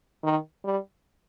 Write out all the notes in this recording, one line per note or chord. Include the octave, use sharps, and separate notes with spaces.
D#3
G3